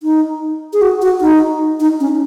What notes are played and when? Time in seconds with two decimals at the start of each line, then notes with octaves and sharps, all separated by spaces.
0.03 D#4
0.73 G#4
0.81 F#4
1.02 F#4
1.21 D#4
1.80 D#4
2.00 C#4